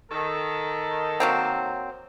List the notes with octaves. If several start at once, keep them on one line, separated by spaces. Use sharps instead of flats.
D#3 A4
F#3 A#3 C4